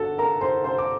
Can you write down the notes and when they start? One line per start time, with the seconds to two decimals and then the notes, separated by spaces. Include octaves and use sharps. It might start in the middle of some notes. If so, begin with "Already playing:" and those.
Already playing: G1 D3 F#4 A4 F#5 A5
0.18 A#4 A#5
0.41 C5 C6
0.64 C5 C6
0.78 D6